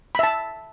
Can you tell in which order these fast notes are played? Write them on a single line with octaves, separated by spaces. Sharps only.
B5 E5 A5